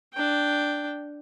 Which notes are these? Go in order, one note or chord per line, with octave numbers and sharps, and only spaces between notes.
D4 G5